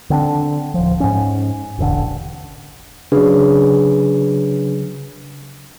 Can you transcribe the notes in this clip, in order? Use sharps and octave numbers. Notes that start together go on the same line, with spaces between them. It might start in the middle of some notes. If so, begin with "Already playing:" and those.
D3 C4 D4
D1 F3
G#2 C#4
E1 A1 D3
C#3 F#3 D4 G#4 B4